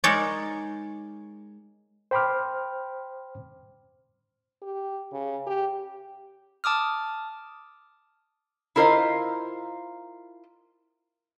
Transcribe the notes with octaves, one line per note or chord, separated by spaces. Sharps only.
G#3 D#4 A#4 C#5 D5
C5 G5 B5 C6 D6 F6
G4
C#3
G4
A5 D6 D#6 F6
E4 F4 A#4 C5 D#5 F5